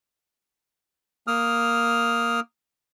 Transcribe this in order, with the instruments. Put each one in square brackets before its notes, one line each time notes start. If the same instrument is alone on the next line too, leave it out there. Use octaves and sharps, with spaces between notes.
[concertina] A#3 D#6 F6